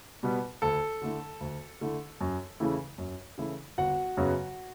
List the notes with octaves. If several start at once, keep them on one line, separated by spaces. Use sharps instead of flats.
B2 G3 B3
D2 A4 A5
D3 A3 E4
D2
D3 A3 E4
F#2
C#3 E3 A3 E4
F#2
C#3 E3 A3 E4
G1 F#4 F#5
F#2 C#3 F#3 B3